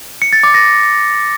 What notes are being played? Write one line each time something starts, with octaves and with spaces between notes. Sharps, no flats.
C#7
A6
D6
A#6